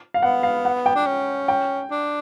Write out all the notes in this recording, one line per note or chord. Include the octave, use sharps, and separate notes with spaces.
F5
B3 F#5
F5
F#5
G5
D4
C#4
G5
D4